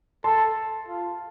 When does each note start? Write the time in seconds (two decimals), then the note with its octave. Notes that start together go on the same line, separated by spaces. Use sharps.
0.24 A4 A5 C6
0.88 F4